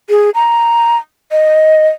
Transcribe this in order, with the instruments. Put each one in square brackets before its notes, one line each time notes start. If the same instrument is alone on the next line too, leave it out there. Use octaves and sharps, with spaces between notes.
[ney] G#4
A#5
D#5